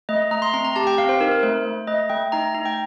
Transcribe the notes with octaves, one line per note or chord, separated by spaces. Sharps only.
A3 D#5
A3 A#5
C6
C4 A#5
A#5
G4 A5
G5
C4 F5
C5
D#4 A#4
A3 C5
A3
A3 D#5
A3 G5
D#4 A#5
D#4 A#5
G5